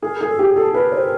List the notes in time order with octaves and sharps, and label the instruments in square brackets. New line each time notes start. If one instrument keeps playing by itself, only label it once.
[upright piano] G#4 [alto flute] A#4
[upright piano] G#4
[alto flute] A4
[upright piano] G4
[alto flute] G#4
[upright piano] A4
[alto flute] A#4 [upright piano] B4
[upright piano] C5